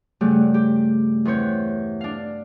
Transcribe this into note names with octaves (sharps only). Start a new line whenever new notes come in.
G2 C#3 G3 A3 F#4 G4
G4
E2 C4 B4 C#5 G6
D4 F5